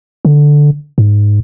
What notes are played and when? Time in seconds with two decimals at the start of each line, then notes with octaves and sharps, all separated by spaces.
0.25 D3
0.98 G#2